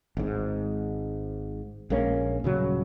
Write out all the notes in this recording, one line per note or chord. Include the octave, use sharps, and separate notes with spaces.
G#1 G#2
A#1 G#3 A#3 C#4
D#1 C#3 F#3